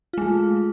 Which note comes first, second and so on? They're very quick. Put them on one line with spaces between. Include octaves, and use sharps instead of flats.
F4 G#3 A3